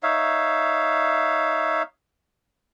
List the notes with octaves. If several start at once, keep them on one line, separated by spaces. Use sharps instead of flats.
D#4 C#5 E5 F5